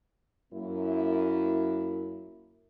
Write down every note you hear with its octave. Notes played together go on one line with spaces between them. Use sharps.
F#2 A#3 E4